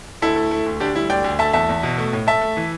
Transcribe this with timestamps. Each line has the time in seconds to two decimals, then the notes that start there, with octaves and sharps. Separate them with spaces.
0.22 D2 E4 A4
0.36 A3
0.51 A3
0.66 D2
0.80 D2 D4 G4
0.96 G3 E4
1.10 D2 D5 G5
1.24 D2
1.39 A3 E5 A5
1.53 E2 E5 A5
1.69 E2
1.83 B2
1.98 A3
2.13 A2
2.27 A3 E5 A5
2.41 A3
2.57 E3